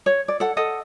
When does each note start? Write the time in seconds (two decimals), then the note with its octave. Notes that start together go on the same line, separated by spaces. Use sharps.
0.06 C#5
0.28 D5
0.40 A4 F#5
0.57 A4 D#5 F#5